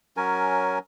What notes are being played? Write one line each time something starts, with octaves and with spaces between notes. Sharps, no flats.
F#3 C#4 A#4 G#5